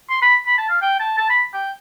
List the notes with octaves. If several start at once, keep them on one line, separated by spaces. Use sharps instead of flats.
C6
B5
B5
A5
F5
G5
A5
A5
B5
G5